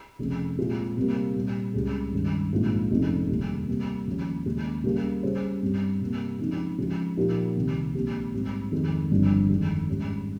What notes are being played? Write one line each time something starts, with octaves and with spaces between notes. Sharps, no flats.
F1 F2 C#3
A#2 G#3 C4 F4
C3 G3 A#3
A#2 G3 C4
C#2 C#3 G3 C#4 G#4
G2 D#3 G#3 C#4
A#1 G#2 F3 C4 F4
F1 F2 C#3 G#3 D#4
F1 D#2 C#3 G3
C3 G3 A#3
D#2 C#3 F3 G#3 C#4
D#2 C#3 G#3
C#3 G3 A#3
C#3 G3 C#4 G#4 C5
G2 G3 C4
C3 G3 A#3
C#3 F3 G#3 C4 D#4
C#3 F3 G#3
A#2 F3 A#3 D#4 G4
C2 C3 D#3
A#1 A#2 G#3 C4 G4
G#2 G3 C4
F2 D#3 G#3
G1 G2 F3 C4
F2 D#3 G#3
G#2 G3 C#4